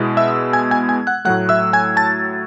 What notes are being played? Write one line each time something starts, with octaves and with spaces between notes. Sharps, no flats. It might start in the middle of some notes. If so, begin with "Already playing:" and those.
Already playing: B2 G#3 B3 E4
E5 E6
G#5 G#6
G#5 G#6
G#5 G#6
F#5 F#6
A2 F#3 A3 F#5 F#6
E5 E6
G#5 G#6
A5 A6